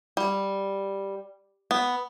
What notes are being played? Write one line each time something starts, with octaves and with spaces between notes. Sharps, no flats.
G3
B3